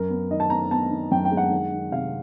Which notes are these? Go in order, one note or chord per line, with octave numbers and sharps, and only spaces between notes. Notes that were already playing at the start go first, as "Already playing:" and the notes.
Already playing: F#2 A#4
B3
D#3 D#5
A5
B3 A#5
B3 A5
D#3
F#2 G5
G5
G#3
F#5
D#3
D#3
C3 F5